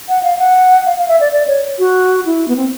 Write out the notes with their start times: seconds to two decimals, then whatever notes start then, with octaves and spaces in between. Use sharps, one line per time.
0.09 F#5
0.23 F5
0.39 F#5
0.86 F5
0.98 F5
1.08 E5
1.20 D5
1.32 D5
1.48 C#5
1.79 F#4
2.26 E4
2.48 B3
2.56 C4